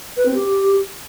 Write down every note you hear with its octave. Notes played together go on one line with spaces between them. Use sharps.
B4
C4
G4